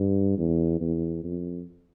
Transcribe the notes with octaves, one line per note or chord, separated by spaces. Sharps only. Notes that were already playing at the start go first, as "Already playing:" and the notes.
Already playing: G2
E2
E2
F2